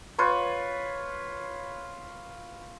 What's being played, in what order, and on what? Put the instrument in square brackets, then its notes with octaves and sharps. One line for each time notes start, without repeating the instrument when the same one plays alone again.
[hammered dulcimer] F4 B4 C#5